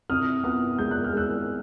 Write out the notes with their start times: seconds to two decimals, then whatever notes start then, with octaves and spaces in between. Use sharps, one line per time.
0.10 C3 D#6 F6
0.44 B3 D#6 F6
0.78 G#3 G6
0.91 F#6
1.04 F6
1.13 G#3 E6 F#6